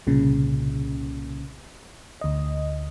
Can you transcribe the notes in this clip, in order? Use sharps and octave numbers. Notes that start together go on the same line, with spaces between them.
C2 A#2 C#3
D2 D#5